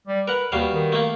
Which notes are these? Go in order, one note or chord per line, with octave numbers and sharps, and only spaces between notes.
G3
A#4 B4 F#5
D#2 B2 G3 F5
D#3
A3 A#3